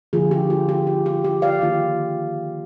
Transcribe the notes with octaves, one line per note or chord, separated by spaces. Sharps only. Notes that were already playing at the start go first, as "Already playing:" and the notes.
D3 F3 A#3 F4 G#4
G4
F4
G4
F4
G4
G4
D5 F5
D#3 A#3 F4